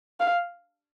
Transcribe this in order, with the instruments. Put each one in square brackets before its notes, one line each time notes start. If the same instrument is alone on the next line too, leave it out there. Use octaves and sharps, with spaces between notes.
[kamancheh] F5